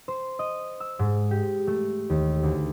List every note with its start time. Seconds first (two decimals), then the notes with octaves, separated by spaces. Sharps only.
0.08 C5
0.39 D#5
0.80 E6
0.99 G#2
1.31 G4
1.67 A3
2.10 D#2
2.43 D2